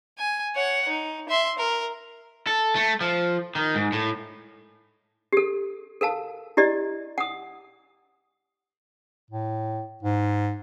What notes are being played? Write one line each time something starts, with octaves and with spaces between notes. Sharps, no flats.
G#5
C#5 F#5
D#4
E5 C6
A#4
A4
A3
F3
D#3
G#2
A2
G4 A4
A4 A#4 F5 A5
E4 G4 D5 D#5
F#5 D#6
A2
G#2